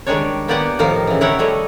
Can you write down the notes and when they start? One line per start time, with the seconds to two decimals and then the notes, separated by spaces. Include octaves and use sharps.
0.06 D#3 G3 G#3 D4 C#5
0.48 A#3 B3 G4 D5 F#5 G#5
0.79 A2 D#3 F3 D#4 A#4 F5
1.07 C#3 E3
1.21 D#3 E4 A#4 C#5 F#5 G5
1.39 G3 A3 C#5 D#5